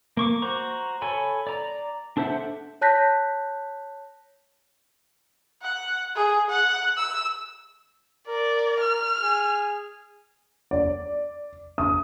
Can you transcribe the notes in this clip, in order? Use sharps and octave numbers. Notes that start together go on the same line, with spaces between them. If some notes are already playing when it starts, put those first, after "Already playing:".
A#3 C#6 D6
F#4 C5 A#5 C#6
A4 C#5 G#5 B5
D5 A#5
D4 A4 C5 E5 F#5
C#5 A5 F#6 G6 A#6 B6
F#5
G#4
F#5
E6
A#4 D5
F6
G#4
D5
D#6